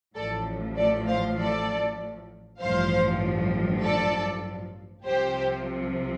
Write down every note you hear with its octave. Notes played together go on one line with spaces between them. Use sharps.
A1 A2 F3 A4 D5
A4 D5
C5 F5
A4 D5
A1 G2 F3 C5 F5
A4 D5
C2 C3 F3 G4 C5